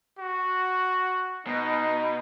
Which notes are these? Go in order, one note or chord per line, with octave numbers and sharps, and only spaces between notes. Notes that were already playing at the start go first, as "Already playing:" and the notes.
F#4
B2 D#4